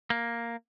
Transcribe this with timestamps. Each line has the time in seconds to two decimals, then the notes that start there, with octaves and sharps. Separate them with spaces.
0.10 A#3